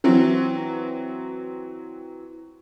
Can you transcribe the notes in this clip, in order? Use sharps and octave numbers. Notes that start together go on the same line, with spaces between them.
E3 F#3 C4